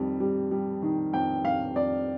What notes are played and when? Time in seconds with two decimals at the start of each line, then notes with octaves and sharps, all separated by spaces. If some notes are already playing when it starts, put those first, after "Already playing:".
Already playing: F2 D#3 G3
0.20 G3
0.51 G3
0.82 D#3
1.13 F2 G5
1.44 F2 F5
1.75 F2 D5